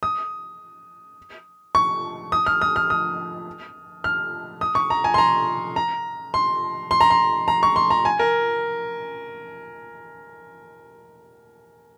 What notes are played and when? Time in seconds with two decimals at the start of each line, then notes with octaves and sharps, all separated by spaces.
0.03 D#6
1.75 C#6
2.32 D#6
2.46 F6
2.62 D#6
2.76 F6
2.90 D#6
4.04 F6
4.61 D#6
4.75 C#6
4.90 A#5
5.04 G#5
5.14 C6
5.18 A#5
5.76 A#5
6.34 C6
6.91 C6
7.01 A#5
7.10 C6
7.48 A#5
7.63 C#6
7.76 C6
7.91 A#5
8.05 G#5
8.19 A#4